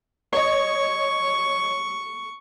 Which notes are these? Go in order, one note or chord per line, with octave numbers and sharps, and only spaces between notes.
C#5 D#5 C#6